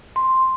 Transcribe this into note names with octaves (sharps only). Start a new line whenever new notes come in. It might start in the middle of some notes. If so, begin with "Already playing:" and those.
C6